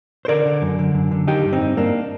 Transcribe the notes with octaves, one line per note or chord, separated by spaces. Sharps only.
C5
D3 A#4 D5
D3
F#2
D3
F#2
D3
D#3 D#4 G4
G2
C4 D#4
G2
G2 A#3 D4